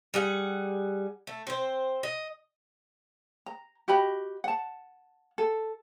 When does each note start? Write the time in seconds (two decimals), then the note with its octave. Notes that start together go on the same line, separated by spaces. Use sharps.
0.14 G3 G#4 F#5
1.27 A3
1.47 C4 C5
2.03 D#5
3.46 A#5
3.88 F#4 G4 D#5 B5
4.44 F#5 A5
5.38 A4